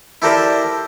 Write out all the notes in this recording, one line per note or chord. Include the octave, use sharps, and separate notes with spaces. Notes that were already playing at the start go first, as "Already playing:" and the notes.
E4 G4 A4 A#4 C5 D5